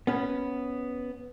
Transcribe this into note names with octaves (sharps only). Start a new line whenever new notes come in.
B3 C#4 B4